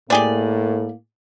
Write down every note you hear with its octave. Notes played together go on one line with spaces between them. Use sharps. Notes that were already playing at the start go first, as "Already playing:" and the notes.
A2 A#3 G4 G#4 D5